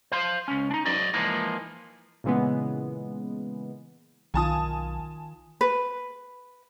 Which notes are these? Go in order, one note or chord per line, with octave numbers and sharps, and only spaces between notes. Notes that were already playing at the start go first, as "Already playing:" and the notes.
C5 F5 C6
C#2 C#4
D4 D#4
F#3 F#4 G#4 D5 D#5
E3 F3 G#3 A#3 D#4
A#2 C#3 E3 G#3 B3
B1 D#3 F4 G#5 A5 D#6
B4